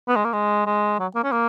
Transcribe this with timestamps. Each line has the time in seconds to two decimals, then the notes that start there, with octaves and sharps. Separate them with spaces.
0.08 B3
0.16 G#3
0.25 A#3
0.33 G#3
0.66 G#3
0.99 F#3
1.15 A#3
1.24 C#4
1.32 A#3